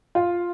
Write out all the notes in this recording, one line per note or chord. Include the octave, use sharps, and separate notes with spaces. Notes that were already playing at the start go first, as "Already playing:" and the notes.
F4